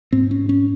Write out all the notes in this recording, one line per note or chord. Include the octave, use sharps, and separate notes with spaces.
G#2 C4
C#4
C#4